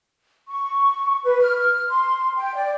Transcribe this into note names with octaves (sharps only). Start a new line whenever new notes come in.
C#6
B4
F6
F6
C6
G5
D5